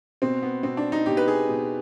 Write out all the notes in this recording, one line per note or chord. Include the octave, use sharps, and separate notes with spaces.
B2 C4
B3
B2 C4
D4
D#4
B2 G4
B4
G#4
B2